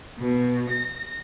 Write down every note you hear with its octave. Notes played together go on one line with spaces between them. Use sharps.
B2
A#6